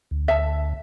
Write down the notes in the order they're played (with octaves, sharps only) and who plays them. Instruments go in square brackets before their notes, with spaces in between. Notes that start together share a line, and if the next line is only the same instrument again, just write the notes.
[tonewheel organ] D2
[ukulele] E5 A5